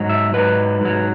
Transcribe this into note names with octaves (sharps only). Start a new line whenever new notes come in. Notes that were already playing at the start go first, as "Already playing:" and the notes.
Already playing: G#2 F#3
E5
G#2 F#3 B4
G#2 F#3